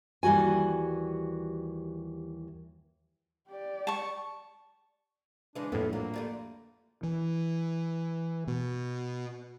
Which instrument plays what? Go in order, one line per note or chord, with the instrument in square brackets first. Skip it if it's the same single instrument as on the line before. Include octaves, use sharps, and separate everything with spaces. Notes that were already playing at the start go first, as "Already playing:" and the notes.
[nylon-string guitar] D#2 E3 G3 F#4 G#5
[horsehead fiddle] G4 D5
[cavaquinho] A5 C#6
[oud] C#3 E3 G#3 [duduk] D4
[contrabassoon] A#1 [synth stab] F2 A2 [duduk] G3 [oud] A3 B3 A4
[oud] F#3 [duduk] A#3
[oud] D3 G3 A3
[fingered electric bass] E3
B2